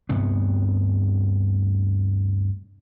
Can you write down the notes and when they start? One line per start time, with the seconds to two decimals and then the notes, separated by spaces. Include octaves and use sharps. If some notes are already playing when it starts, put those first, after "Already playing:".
0.09 D2 G2 C3 B3